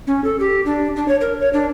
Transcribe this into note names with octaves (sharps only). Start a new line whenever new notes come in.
C#4
A4
G4
D4
D4
C#5
A#4
C#5
D4